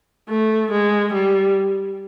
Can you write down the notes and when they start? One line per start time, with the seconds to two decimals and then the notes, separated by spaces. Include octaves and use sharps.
0.29 A3
0.72 G#3
1.14 G3